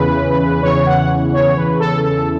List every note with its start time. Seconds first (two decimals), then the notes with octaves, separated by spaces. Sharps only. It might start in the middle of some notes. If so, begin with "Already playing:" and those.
Already playing: E2 C#3 E3 B4
0.63 E2 C#3 E3 C#5
0.86 F#5
1.33 C#5
1.57 E2 C#3 E3 B4
1.80 A4
2.04 A4